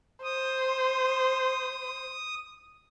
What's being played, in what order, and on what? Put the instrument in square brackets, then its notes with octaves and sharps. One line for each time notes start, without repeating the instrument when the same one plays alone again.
[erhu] C5 [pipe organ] D#6